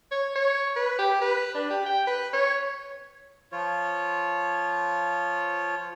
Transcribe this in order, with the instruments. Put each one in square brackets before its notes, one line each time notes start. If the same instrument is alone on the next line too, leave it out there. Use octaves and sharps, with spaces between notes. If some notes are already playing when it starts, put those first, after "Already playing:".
[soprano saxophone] C#5
C#5
B4
G4
B4
D4
G4
G5
B4
C#5
[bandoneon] F3 F4 C#5